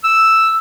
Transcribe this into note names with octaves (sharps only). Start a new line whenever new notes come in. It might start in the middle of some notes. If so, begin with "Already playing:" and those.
E6